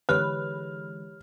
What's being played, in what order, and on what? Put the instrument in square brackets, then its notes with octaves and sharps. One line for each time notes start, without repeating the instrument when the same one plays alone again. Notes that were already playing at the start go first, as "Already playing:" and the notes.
[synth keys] D3 E3 G#3 [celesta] G4 C#5 [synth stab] B4 [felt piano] F6